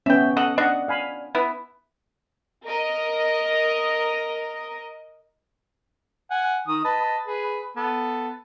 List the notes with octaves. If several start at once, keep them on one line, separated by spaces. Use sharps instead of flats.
B3 C#4 E5 G5
A4 D#5 F#5
D4 D#5 F#5
F5 G#5 B5
B3 E4
A#4 D#5
F#5 G#5
D#3 D#6
B4 D#5 A5
G#4 B4
B3 A4